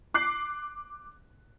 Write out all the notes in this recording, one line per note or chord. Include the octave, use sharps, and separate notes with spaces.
D6 F#6 C7